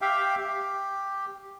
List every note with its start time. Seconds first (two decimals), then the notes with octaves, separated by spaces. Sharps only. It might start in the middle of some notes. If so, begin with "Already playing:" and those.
0.01 G4 E5 F5 G5
0.40 G4